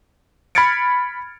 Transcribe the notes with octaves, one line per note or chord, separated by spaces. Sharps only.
B5 F6 G#6 A6 C#7 D7